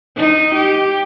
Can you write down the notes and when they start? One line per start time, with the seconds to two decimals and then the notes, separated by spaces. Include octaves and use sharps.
0.17 D#4
0.54 G4